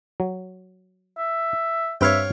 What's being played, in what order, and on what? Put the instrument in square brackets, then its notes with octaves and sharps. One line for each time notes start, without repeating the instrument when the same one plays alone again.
[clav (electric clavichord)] F#3
[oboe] E5
[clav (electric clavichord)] G2 C4 B4 [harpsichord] C#5 F5 G5 [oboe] E5